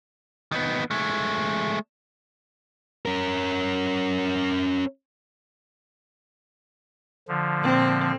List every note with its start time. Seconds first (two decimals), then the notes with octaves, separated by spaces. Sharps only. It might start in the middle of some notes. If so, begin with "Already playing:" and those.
0.52 D#3 B3
0.91 G#3 A3
3.06 C#4 A#4
7.28 D3 F3
7.59 A#2 C4